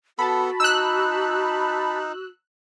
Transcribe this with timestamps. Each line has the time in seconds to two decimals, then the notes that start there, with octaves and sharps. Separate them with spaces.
0.19 B3 F#4 A4 A5 B5
0.60 D#4 E6 F#6